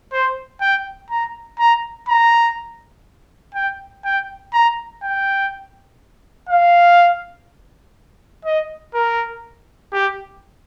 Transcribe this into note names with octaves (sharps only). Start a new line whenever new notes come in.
C5
G5
A#5
A#5
A#5
G5
G5
A#5
G5
F5
D#5
A#4
G4